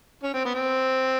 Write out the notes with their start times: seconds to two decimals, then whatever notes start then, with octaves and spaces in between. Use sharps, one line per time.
0.23 C#4
0.34 C4
0.45 B3
0.55 C4